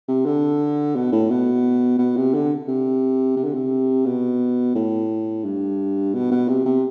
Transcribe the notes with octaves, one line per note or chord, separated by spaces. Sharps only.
C3
D3
B2
A2
B2
B2
C3
D3
C3
C3
D3
C3
B2
A2
G2
B2
B2
C3
C3